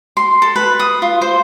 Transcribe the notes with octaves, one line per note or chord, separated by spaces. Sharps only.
C6
A4
B4
D#6
F4
C5